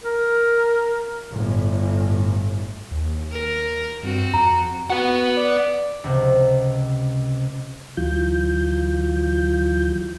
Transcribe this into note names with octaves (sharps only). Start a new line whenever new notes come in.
A#4
G1 A2
D#2
A#4
G2 C4 F#4
F2 A#5
F#4 B4 F#5
D5
C#2 C3
D2 E3 F#3 F4 G6